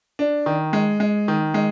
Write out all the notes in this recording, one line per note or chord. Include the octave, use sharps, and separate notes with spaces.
D4
D#3
G#3
G#3
D#3
G#3